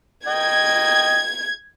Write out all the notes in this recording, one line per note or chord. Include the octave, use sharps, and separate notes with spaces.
D#5 G5 G#6